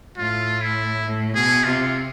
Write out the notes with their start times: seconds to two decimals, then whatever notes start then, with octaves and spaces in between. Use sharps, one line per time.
0.18 A2 F4
0.61 E4
1.06 A2
1.35 B2 G#4
1.64 C3 F4